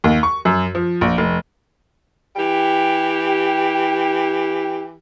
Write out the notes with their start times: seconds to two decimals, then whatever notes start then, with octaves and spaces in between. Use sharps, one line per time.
0.04 D#2
0.23 C#6
0.45 F#2
0.75 F3
1.01 A#1
1.18 F1
2.36 E3 G4